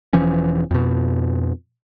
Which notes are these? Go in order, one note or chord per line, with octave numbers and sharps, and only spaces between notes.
E1 E3 F3 C#4
F2 B2